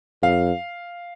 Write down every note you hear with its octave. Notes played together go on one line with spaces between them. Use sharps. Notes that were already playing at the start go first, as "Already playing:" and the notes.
F2 F5